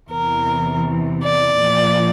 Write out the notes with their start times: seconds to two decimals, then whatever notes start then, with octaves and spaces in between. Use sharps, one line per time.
0.10 E2 C3 E3 A#4
1.23 D5
1.60 A#2 F3